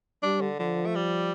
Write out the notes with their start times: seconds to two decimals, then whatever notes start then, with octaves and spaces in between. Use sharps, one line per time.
0.23 G3 D4
0.41 D3
0.59 D3 F3
0.86 A3
0.95 G3